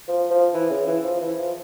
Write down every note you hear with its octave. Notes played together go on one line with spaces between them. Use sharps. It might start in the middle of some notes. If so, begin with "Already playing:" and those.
F3
F3
E3
C#3
E3
F3
E3
F3